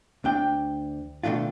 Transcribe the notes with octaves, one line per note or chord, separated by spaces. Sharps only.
D2 D4 G5
B2 D#3 A3 D4 F4